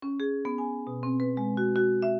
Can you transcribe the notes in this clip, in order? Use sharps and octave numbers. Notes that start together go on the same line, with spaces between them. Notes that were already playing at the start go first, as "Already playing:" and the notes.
C#4
G#4
B3
G#5
B2
C4
B4
G#3
F#4
F#4
E5